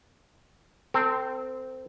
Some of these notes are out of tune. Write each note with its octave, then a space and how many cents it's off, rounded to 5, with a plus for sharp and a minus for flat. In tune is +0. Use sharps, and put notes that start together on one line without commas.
C4 -15 A4 +30